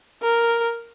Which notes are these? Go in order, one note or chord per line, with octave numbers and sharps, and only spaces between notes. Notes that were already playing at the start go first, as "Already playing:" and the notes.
A#4